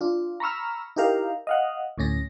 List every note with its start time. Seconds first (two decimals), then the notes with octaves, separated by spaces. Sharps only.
0.01 D4 F4
0.40 A#5 B5 C#6 E6 F6
0.96 D#4 E4 G4 A#4 F5
1.47 D#5 F5 F#5
1.98 D2 A2 C#4 A#6